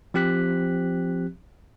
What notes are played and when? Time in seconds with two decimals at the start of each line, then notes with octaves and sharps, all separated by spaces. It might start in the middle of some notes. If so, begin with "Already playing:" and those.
0.14 F3 C4 G4 F#6 B6